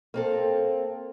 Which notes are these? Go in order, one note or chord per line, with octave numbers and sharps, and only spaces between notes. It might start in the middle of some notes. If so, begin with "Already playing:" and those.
A#3 C4 A4